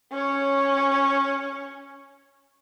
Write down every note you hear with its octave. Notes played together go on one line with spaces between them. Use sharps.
C#4 C#5